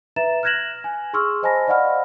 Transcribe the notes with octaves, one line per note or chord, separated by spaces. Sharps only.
B4 E5 A#5 A6 E7
F6 F#6 G#6 A#6 E7 F#7
G#5
G#4 C6 C#6 E6 F6
C5 D#5 G#5 A5 B5 A#6
D5 D#5 F5 F#5 B5 F6